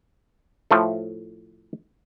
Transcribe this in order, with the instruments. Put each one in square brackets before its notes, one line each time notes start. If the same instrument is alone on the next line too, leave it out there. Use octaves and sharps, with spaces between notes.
[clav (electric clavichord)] A2 F3 A3